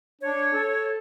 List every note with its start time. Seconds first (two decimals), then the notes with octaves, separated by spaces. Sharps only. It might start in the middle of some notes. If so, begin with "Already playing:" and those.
0.21 D4 C#5
0.53 A4